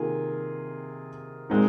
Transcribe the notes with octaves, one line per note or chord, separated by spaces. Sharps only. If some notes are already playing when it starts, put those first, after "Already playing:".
Already playing: C3 D#3 A#3 F4 G#4
A#2 G#3 C4 D#4